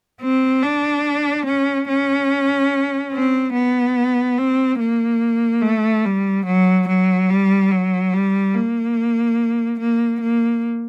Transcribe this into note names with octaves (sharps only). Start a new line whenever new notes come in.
C4
D4
C#4
C#4
C4
B3
C4
A#3
A3
G3
F#3
F#3
G3
F#3
G3
A#3
A#3
A#3